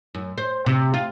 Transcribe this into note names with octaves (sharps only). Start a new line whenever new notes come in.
F#2
C5
C3
F4